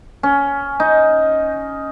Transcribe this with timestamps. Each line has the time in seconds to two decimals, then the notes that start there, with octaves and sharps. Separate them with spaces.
0.23 C#4
0.80 D#4